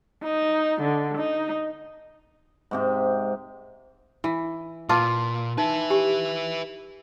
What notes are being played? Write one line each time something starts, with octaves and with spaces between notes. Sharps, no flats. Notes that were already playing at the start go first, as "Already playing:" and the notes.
D#4
D3
D#4
G#2 C3 G4
E3
A#2 F4 B4 A5 D6
D#4 B4 E5
G4 G#5 C6